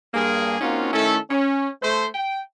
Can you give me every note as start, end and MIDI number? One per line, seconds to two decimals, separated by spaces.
0.14 0.55 43
0.14 0.55 58
0.14 0.55 68
0.60 0.89 58
0.60 0.89 60
0.60 0.89 61
0.60 0.89 63
0.60 0.89 65
0.60 0.89 66
0.93 1.17 51
0.93 1.17 57
0.93 1.17 61
0.93 1.17 64
0.93 1.17 69
1.30 1.69 61
1.82 2.06 57
1.82 2.06 72
2.15 2.39 79